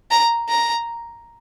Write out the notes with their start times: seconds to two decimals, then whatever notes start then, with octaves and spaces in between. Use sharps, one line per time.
0.11 A#5
0.49 A#5